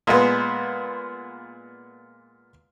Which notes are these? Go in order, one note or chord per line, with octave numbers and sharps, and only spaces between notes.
A#2 G#3 B3